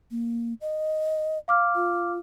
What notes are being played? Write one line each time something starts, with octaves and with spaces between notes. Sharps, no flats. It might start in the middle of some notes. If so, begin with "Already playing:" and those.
A#3
D#5
F5 D6 F6
F4